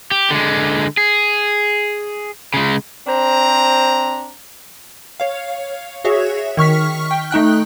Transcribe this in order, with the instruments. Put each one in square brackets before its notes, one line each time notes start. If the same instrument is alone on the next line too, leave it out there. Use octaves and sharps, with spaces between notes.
[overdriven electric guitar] G4
D3 G#3
G#4
C#3 G#3
[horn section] C4 D4 C5 A#5
[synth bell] C#5 F5
F#4 G#4 C#5 E5
D#3 C#6 F6 B6
G5
A3 D#4 G5 F#6